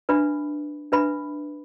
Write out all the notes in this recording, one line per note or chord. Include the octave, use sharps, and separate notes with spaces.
D4 B4 E5 B5
D4 B4 E5 B5